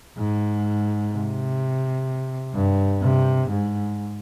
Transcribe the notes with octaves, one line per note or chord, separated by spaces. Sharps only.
G#2
C3
G2
C3
G#2